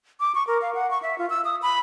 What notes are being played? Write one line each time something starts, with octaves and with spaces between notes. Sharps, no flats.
D6
C#6
A#4
F5
F#5
C#6
E5
F4
E6
D#6
B5